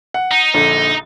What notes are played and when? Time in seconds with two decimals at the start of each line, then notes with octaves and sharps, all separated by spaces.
0.14 F#5
0.32 D#4
0.54 A#1 D3